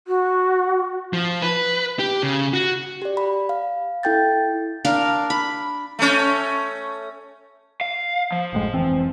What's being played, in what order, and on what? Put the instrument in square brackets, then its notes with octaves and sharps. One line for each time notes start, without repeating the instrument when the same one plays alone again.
[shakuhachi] F#4
[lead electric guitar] F3
B4
G4
C#3
F#4
[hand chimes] G4 D5
B5
F5
E4 A4 G5 G6 A6
[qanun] D4 A#4 F5
B5
[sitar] A3 C#4
[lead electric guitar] F5
F3
[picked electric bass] F#1 A2 G#3
F1 E3 C4